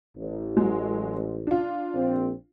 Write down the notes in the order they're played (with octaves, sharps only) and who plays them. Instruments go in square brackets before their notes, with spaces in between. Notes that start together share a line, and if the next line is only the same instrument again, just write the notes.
[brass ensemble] A1
[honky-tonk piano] F#3 G#3
D4 F4
[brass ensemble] A#1 C4